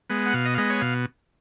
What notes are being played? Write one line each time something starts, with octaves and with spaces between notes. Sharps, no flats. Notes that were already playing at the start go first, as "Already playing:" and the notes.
G#3 B3
F#5
B2 F5
D#5
F5
G#3 B3 D#5
C#5
B2 F5